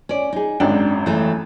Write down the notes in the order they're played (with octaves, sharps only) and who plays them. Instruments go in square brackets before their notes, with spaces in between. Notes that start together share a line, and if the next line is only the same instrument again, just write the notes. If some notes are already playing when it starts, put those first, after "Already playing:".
[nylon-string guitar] C#4 D5
D#4 G#4
[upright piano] G#1 F#2 G5 [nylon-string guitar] D4
[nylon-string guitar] E3 A3